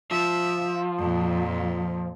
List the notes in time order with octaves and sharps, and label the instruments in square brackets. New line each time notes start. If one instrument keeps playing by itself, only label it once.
[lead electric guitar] F3 [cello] E5
[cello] F2 A#2